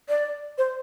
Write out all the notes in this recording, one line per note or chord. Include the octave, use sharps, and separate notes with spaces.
D5
C5